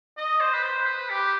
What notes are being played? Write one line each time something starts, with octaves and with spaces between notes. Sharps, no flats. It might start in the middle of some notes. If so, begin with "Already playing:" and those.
D#5
C5
B4
C5
B4
G4